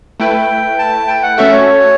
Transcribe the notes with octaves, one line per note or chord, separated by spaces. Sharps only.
A3 E4 B4 G5
A5
G5
F#5
A3 C#4 F#4 A4 E5
C#5